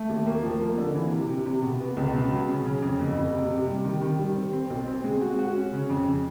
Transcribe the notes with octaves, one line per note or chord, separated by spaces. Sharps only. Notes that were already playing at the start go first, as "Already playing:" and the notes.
Already playing: A3
D#2
A#3
F3
A#3
D3
E3
C3
C3
C3
B2
B3
C#2
B2
F#3
C#3
C#3
F2
F#1
F#1
C3
C3
G3
D#3
D#3
G3
C4
C4
B1
C4
G#3
F#4
F#4
C#4
C#3
F2
C#3